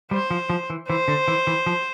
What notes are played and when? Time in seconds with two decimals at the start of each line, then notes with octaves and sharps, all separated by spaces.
0.11 G3 C5
0.31 F3
0.50 F3
0.70 E3
0.89 E3 C5
1.08 D3
1.28 E3
1.47 E3
1.66 F3